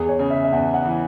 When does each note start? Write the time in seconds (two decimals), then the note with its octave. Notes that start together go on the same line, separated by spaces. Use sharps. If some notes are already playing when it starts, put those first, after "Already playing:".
Already playing: E2 G#4
0.09 C#5
0.19 C#3
0.30 E5
0.44 E5
0.52 E2 F#5
0.74 F#5
0.85 E3